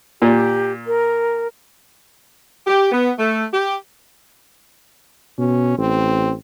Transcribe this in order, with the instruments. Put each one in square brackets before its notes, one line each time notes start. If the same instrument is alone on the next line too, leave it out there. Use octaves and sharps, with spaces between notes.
[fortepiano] A#2 [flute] G4
[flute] A#4
[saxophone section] G4
B3
A3
G4
[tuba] B2 [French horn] C#4
[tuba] A1 [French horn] C4